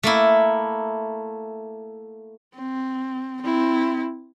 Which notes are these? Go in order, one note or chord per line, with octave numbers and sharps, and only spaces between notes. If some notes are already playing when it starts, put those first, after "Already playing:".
A3 A#3 E4
C4
C4 E4